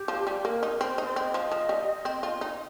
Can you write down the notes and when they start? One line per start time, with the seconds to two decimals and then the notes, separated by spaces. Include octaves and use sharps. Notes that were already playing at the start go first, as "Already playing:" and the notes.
Already playing: G4
0.08 F3
0.27 G3
0.45 A#3 A#4
0.63 D#4
0.80 C4 C5
0.98 D#4
1.04 C5
1.16 C4 D#5
1.34 F3
1.52 F3
1.69 G3
2.05 C4
2.23 F4
2.41 D#4